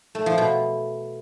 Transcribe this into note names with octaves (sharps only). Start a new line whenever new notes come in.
A3
F3
B2